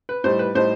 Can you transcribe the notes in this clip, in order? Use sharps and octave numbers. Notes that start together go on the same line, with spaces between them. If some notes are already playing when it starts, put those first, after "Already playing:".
B4
A2 G3 D#4 C5
B4
A2 G3 D#4 C5